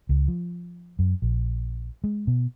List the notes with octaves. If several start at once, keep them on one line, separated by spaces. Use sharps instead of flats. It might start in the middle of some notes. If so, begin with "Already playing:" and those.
C#2
F3
F#2
A#1
G#3
B2